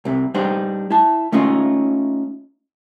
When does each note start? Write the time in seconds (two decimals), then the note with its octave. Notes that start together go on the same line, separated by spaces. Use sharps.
0.05 C2 C3
0.34 G3 D4 D#4 C5
0.91 E4 A5
1.32 A3 C#4 D#4 F4